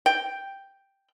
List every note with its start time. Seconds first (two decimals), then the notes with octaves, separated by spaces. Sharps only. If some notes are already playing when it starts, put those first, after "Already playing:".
0.06 G5